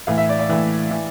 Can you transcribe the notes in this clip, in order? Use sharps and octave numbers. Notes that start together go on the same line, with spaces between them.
A2 E3 F5
E5
D5
D5
A2 E3
E3